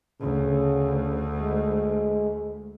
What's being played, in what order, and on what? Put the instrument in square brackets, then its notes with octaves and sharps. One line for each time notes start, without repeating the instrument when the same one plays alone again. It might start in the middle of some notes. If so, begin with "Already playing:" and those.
[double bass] D2 [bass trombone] C#3
[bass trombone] G#3